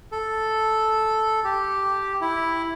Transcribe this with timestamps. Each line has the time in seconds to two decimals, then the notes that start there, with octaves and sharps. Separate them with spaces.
0.12 A4
1.44 G4
2.21 E4